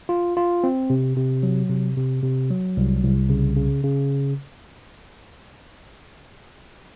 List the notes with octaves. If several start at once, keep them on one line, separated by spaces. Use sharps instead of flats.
F4
F4
C4
C3
C3
F#3
C3
C3
C3
F#3
C2
C2
C#3
C#3
C#3